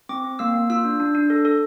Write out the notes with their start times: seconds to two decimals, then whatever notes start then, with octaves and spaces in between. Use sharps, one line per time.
0.09 C4 D6
0.24 C4
0.39 A#3 E6
0.54 A#3
0.70 F4 E6
0.85 D4
1.00 D4
1.15 D4
1.30 A4
1.45 A4